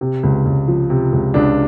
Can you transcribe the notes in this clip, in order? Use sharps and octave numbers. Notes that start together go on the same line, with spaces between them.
C3
C#2
C#2
F3
C3
C#2
C#2 D4